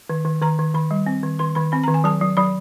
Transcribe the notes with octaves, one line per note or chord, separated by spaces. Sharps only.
D#3
D#3
D#3 A#5
D#3
D#3 B5
G3
C4
D#3
D#3 C6
D#3 B5
C4 B5
D#3 A#5
G#5
F#3 A5
F#3
F#3 B5